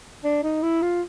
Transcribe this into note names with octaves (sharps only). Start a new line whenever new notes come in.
D4
D#4
E4
F4